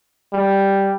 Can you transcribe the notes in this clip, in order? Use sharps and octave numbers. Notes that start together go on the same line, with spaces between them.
G3